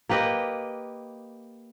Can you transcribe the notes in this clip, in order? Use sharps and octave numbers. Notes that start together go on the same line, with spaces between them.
A#3 G4 B4 D#5